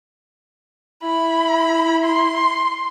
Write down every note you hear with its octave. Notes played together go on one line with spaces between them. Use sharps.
E4 B5
C6